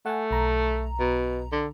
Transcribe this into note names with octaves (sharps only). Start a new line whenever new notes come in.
A3 F#5 G#5
B1 A#5
B2
D3